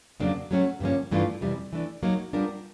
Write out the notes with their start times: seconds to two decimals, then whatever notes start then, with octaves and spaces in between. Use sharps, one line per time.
0.20 F2 C#3 F#3 A#3 D4
0.51 F#3 A3 C#4 F#4
0.80 G2 D3 F3 A#3 C#4
1.11 G2 E3 A3 D4 F4
1.41 F2 C3 E3 G3
1.73 E3 A3 D4
2.03 F#3 A#3 D#4
2.33 G3 B3 D4 F4 A#4